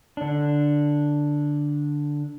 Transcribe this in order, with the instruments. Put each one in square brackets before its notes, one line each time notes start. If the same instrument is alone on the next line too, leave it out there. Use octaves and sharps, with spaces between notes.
[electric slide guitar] D3 D4